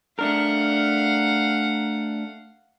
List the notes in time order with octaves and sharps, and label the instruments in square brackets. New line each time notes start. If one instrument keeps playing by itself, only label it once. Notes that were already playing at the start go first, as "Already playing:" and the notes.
[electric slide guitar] A3 D4 A#4 [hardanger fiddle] F5 F#5